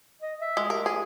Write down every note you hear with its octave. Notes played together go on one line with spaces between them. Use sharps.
D#5
E5
G#3
G4 A#4
G#4